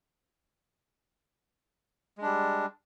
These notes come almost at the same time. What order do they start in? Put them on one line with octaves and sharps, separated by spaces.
G#3 D4 G3